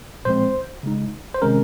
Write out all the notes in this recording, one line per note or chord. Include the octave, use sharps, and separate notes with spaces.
A#2 F3 G#3 C4 C5
C#3 G#3 D#4
C5
C3 D#3 G#3 C#4 A#4